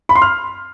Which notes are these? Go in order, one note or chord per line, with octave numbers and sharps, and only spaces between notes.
B5
C6
F6